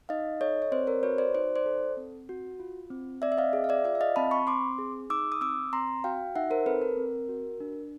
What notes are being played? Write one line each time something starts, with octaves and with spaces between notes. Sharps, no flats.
D#4 D#5 F5
A4 C#5 D#5
C#5
C4 C5 D5
A#4 C5
F#4 B4 C#5
C5 D5
D#4 C5 D5
C5 D5
A4
C4
F#4
F4
C4
C4 D5 E5
E5
D#5 F5
G#4
F5
D5 E5
F4 D5 E5
E5
D#5 F5
C4 A5 B5
B5 C#6
C4 C6 D6
G#4
D#4 D6 E6
D#6
C4 D6 E6
C4 A#5 C6
F#4 F5 G5
D#4 E5 F#5
A#4 C5
C4 A4 B4
A#4
C4
F#4
D4